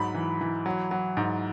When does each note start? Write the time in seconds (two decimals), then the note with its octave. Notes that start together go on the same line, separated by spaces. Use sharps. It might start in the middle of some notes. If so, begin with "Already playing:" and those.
Already playing: G#2 F#3 B5
0.14 E3
0.41 E3
0.66 F#3
0.91 F#3
1.17 G#2